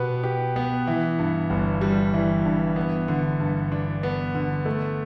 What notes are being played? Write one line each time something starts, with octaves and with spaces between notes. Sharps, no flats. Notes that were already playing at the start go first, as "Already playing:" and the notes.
Already playing: B2 B3 G4 B4
G4
B3
E3
G2
G1
G3
E3
G2
B3
D3
G2
D4
B3
D3
A3